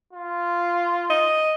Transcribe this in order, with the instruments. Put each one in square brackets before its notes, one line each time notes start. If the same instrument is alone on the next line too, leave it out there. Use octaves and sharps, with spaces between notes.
[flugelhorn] F4
[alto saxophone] D#5